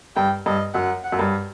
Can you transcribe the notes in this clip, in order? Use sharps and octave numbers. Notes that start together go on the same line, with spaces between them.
G2 G5
G2 D#5
F#2 F#5
F#5
F#2
G2